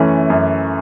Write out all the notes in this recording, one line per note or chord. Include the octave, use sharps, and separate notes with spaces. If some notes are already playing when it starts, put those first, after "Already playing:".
Already playing: F#2 E3 A3 C#4
F#2